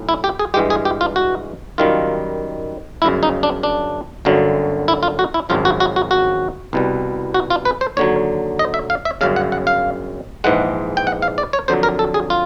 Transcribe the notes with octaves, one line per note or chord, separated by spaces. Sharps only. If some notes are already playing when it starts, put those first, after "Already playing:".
Already playing: B1 A2
E4
G4
G#4
G2 E3 G#3 G4
G#4
G4
F4
F#4
F#2 D#3 G3 F4
G1 F#2 C#3 E4
D#4
D4
D4
G1 F#2 D3 F#3
E4
F4
F#4
E4
G#1 F#2 C#3 F3 F4
F#4
F#4
F#4
F#4
C2 B2 G3
F#4
F4
B4
C5
D#2 D3 F#3 C#5
D#5
E5
F5
E5
G1 F#2 C#3 F5
F#5
F#5
F5
A#1 G#2 E3 G#3 F#5
G5
F#5
F5
D5
C#5
F2 D3 F#3 C5
A#4
A4
G#4
F4